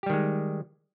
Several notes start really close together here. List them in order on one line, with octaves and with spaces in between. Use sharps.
G4 G3 D#3 G#3